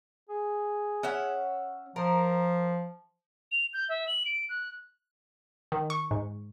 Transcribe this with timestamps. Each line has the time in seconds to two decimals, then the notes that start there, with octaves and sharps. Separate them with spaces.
0.29 G#4
1.03 C#4 E5 F#5
1.96 F3 A#4
3.52 F7
3.74 G6
3.89 E5
4.08 F#7
4.26 D7
4.49 F#6
5.72 D#3
5.90 C#6
6.11 G#2